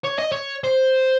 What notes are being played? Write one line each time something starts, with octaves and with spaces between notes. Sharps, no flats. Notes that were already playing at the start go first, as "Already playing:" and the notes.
C#5
D#5
C#5
C5